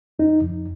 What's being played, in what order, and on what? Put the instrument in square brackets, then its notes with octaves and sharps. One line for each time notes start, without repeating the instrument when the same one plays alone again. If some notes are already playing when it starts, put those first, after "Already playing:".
[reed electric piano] F2 D#4
F2